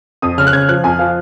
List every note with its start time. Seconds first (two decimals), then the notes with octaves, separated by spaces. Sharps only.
0.22 F2 D#6
0.38 C#3 F6
0.47 F#6
0.53 C#3 G#6
0.69 F3 F#6
0.84 F2 G#5
0.99 F3 F5